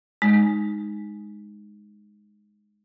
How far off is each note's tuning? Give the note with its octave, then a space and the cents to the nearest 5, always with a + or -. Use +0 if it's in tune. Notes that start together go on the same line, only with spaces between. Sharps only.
G#3 +0 D#4 -5